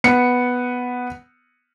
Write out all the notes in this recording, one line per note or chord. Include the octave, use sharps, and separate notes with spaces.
B3 C#7